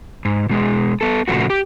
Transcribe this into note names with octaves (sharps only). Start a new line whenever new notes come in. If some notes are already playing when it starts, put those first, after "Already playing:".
G#2
B2 G#3 G#4
B3 A4
A#2 C#3 F3 A3 F#4
G4